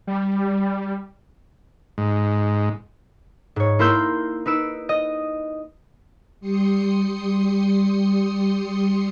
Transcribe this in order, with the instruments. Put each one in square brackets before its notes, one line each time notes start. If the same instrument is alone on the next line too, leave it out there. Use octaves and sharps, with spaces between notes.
[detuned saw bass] G3
[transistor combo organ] G#2
[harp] G#2 C#5
A#3 E4 A#4 C6 E6 G6
D#4 B4 E6 D7
D#5
[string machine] G3 G4 C6 D#6 C7 C#7